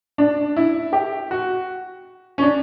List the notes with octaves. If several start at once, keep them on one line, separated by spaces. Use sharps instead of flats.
D4
E4
G4
F#4
C#4
D4